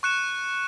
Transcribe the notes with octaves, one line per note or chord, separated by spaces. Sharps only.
C#6 F#6 C#7 E7